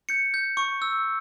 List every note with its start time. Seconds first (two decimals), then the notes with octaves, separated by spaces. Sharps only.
0.09 G6 C#7
0.34 G6
0.57 C#6
0.82 E6